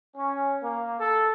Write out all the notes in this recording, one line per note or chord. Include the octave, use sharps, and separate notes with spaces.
C#4
A#3
A4